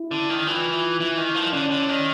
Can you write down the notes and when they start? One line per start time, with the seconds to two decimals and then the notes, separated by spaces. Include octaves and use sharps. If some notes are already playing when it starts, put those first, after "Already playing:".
Already playing: E4
0.11 D3
0.30 D#3
0.47 E3 F4
1.00 E3 E4
1.17 D#3
1.35 F3
1.52 D3 C#4
1.71 D3
1.89 D#3